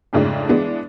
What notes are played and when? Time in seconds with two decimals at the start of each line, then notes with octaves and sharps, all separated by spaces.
0.13 F2 G#2 C#3 A3 D4
0.49 E3 G#3 B3 D4